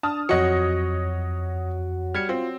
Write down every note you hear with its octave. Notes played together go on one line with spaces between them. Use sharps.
D4 A5 D#6 F6
F2 F#3 C#5 D#5 F#6 C#7
G3 F6 G#6 C#7
C4 F4